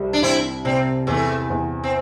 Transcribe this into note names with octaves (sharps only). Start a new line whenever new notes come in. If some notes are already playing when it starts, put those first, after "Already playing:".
Already playing: C2 G3
D4
C2 C4 E4
C3 G3 C4
E2 E3 A3
E2
C4